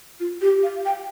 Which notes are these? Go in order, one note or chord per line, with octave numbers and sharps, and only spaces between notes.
F4
G4
F5
G5